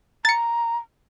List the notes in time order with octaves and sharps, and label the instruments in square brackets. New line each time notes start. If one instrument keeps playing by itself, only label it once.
[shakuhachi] A#5 [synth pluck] A6 C#7